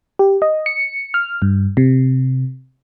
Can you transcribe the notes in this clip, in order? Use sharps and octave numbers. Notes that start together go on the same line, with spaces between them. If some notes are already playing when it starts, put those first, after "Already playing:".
G4
D#5
C#7
F6
G2
C3